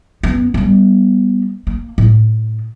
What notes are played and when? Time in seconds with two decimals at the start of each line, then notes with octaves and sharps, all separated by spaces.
0.23 F#2 B3
0.54 G3 B3
1.67 A#3
1.98 A2